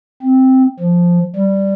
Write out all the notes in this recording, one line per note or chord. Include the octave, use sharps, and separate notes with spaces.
C4
F3
G3